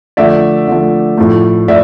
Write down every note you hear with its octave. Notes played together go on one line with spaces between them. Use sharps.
D3 F3 A3 D5 E5
D3 F3 A3
A2 F3 A3
A2 D5 E5